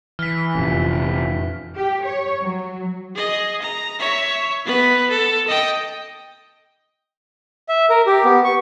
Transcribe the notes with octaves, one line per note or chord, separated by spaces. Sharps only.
E3 F6 B6
F1 F2 A#2 C#4
G4
C#5
F#3
G#4 D#5
A#5
C#5 E5
B3 B4
A4
D#5 G5
E5
A#4
G4
B3
C#6